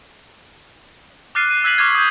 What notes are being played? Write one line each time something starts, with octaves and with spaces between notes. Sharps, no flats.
D6 F6 F#6 A6 C7 D#7
D#7
E6 F#6 G#6 B6 D#7 F#7
C#6 D6 F6 G#6
D#6 G6